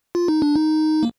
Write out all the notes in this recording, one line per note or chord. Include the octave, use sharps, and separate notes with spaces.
F4
D#4
D4
D#4
A#3